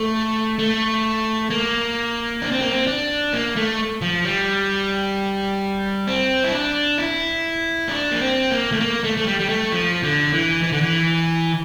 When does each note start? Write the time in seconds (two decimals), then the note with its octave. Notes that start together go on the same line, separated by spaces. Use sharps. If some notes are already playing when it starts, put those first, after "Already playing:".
Already playing: A3
0.59 A3
1.50 A#3
2.42 D4
2.52 C4
2.61 A#3
2.70 C4
2.87 D4
3.33 A#3
3.56 A3
4.02 F3
4.24 G3
6.07 C4
6.44 E4
6.52 D4
6.98 E4
7.89 D4
8.11 A#3
8.21 C4
8.51 A#3
8.72 A3
8.80 A#3
9.04 A3
9.17 A3
9.27 G3
9.40 G3
9.49 A3
9.72 F3
10.03 D3
10.33 E3
10.63 E3
10.72 D3
10.81 E3